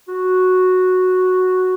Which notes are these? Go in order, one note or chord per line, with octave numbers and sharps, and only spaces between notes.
F#4